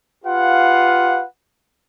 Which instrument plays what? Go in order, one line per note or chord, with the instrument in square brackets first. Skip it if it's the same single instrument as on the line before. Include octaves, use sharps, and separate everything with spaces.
[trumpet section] F4 G4 B4 F5 F#5